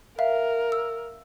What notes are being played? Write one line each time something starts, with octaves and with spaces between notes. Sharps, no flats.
A#4 E5 F5
E6